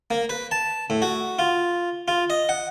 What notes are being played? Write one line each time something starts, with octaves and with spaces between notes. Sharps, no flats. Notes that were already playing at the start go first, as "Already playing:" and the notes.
A#3
B4
A5
A2
F#4
F4
F4
D#5
F#5